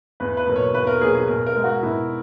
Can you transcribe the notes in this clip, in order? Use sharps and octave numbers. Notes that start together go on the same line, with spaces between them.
E2 B4
B4
B2 F#3 A#3
C#5
E2 B4
A#4
B2 F#3 A#3 G#4
G#4
B2 A#4
A#4
G#3
F#4
B2 E4